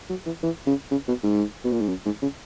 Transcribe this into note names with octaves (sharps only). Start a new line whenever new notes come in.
F#3
E3
E3
C#3
C#3
B2
G#2
B2
A#2
G#2
F#2
G#2
C#3